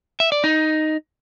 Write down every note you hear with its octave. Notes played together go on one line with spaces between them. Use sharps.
E5
D5
D#4